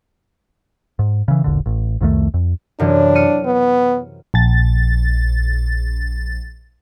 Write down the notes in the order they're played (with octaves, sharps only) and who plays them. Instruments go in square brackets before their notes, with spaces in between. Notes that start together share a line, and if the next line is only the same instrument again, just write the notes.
[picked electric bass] G#2
C#3 E3
E1 A#1 D3
A1
C2 F2 D#3 A3
F2
[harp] F#2 C3 E3 [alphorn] D4
[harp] F6 C#7 D#7
[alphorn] B3
[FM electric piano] A#1 A6